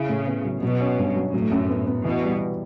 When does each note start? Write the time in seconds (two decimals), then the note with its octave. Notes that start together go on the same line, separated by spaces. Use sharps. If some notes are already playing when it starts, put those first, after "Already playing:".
Already playing: C#3 E4
0.09 A2
0.27 B3
0.45 F#3
0.63 B2 F#3
0.81 C#4
0.98 G2
1.16 F#3
1.34 A2 F#3
1.52 F#2
1.70 B3
1.87 B3
2.05 B2 E3
2.23 G3